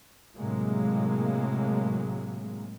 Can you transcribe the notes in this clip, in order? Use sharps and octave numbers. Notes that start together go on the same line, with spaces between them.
A2 C3 F#3 G#3 A#3